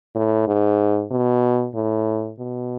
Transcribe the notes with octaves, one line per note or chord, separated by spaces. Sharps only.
A2
G#2
B2
A2
B2